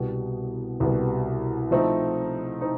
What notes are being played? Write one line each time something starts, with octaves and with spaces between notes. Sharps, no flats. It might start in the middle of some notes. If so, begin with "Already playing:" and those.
Already playing: C2 B2 G3 B3
C2 B2 G3 B3
F3 A3 C4 D#4
C4 D#4